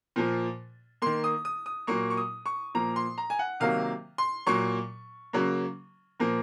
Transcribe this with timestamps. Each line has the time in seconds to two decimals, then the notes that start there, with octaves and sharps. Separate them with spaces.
0.16 A#2 F3 A#3
1.02 D#3 A#3 C6
1.24 D#6
1.45 D#6
1.66 D#6
1.87 A#2 F#3 A#3 C#6
2.10 C#6
2.17 D#6
2.46 C#6
2.75 A#2 F3 A#3 A#5
2.96 C6
3.18 A#5
3.30 G#5
3.39 F#5
3.60 C3 D#3 F#3 A#3 F5
4.18 C6
4.47 A#2 F#3 A#3 C#6
5.33 C#3 F#3 A#3
6.20 A#2 F3 A#3